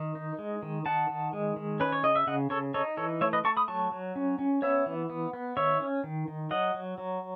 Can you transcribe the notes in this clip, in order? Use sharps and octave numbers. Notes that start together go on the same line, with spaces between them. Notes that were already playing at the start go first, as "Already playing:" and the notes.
Already playing: D#3
D#4
G#3
D#3
D#3 F#5 A5
D#3
G#3
D#3
C#4 B4
C#5
C#3 D#5
E5
C#3 D#5 F#5
C#3 A4 C#5
D#4 A4 C#5
E3 A4 C#5
A3 C#5 E5
B4 D#5
A3 A5 C#6
B5 D#6
F#3 A5 C#6
F#3
C#4
C#4
B3 C#5 E5
E3
B3
B3
D#3 C#5 E5
C#4
D#3
D#3
F#3 D#5 F#5
F#3
F#3